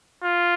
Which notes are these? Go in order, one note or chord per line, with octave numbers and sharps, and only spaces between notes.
F4